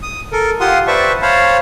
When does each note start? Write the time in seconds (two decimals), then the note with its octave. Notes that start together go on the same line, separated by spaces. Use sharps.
0.02 D#6
0.32 A4 A#4
0.60 F4 G4 F5 F#5 C6 D#6
0.87 B4 C5 D5 E5 A5 C#6
1.22 C5 C#5 F5 A5 B5